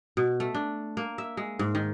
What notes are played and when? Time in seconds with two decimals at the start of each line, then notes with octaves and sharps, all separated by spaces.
0.17 B2
0.40 A3
0.55 D4
0.97 A#3
1.18 E5
1.37 G#3
1.59 G#2
1.75 D#3